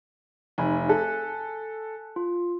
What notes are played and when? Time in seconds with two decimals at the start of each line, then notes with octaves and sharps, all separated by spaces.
0.58 F1 D#4 G#5 B5
0.89 A4 G#5 F#6 B6
2.16 F4